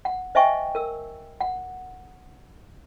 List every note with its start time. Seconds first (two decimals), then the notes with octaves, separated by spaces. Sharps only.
0.05 F#5
0.35 C5 D#5 E5 G5 G#5 C#6
0.75 A#4 E6
1.41 F#5